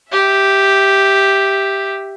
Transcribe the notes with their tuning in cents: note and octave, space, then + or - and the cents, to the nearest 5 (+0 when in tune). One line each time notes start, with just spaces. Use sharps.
G4 +0 E5 +0